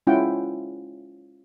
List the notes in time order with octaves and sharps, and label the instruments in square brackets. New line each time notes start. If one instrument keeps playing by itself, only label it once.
[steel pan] G#3 C#4 E4 F4 F#5 G5